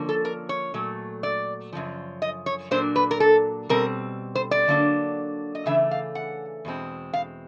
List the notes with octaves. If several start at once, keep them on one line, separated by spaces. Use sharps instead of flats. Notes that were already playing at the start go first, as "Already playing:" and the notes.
Already playing: D3 F3 A#3 C#4
A4
A#4
C#5
A#2 F#3 A3
D5
F#2 C#3 F3
D#5
C#5
A#2 F#3 A#3 D4 C5
B4
A#4
A4
B2 G3 C4 A#4
C5
D5
D3 F#3 A#3 D4
D#5
C#3 E3 A3 D4 E5
F5
F#5
E2 B2 G#3 C4
F5